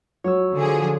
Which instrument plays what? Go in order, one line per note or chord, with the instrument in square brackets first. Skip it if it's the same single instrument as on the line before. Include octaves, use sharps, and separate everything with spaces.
[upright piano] F#3 [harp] C#5 E6
[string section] D3 F3 G#4